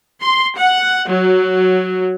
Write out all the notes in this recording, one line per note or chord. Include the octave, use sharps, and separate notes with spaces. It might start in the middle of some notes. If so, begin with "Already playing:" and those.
C6
F#5
F#3